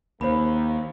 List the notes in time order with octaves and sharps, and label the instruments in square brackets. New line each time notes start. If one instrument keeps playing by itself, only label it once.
[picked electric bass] D#2 [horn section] A#3 [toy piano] C5 B5